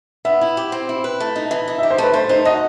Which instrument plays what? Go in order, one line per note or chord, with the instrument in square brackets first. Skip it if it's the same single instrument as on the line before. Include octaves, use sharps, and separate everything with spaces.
[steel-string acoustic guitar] B3 [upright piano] E5
[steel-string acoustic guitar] E4
G4
C4
E4
B4
A3
D#4
E3
D#4
[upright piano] E5
[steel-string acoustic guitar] G4
[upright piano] C5
[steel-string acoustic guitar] A3 [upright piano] B4
[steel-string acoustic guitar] A3 [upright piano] C5
[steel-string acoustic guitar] D#4 [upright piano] C5
[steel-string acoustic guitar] F#4 [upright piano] D#5